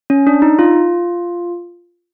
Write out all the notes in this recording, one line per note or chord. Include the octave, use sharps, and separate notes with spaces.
C#4
D4
D#4
F4